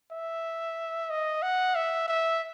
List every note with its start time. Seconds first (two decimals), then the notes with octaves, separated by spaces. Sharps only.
0.11 E5
1.10 D#5
1.43 F#5
1.75 E5
2.08 E5